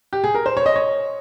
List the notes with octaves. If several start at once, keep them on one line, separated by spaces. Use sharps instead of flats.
G4
G#4
A#4
C5
C#5
D#5
C#5